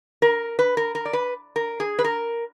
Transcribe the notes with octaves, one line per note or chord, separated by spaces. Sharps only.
A#4
B4
A#4
A#4
D5
B4
A#4
G#4
B4
A#4